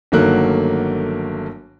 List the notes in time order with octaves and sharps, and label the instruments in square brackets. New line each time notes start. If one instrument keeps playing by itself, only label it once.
[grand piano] G1 D#3 F#3 A3 A#3 F#6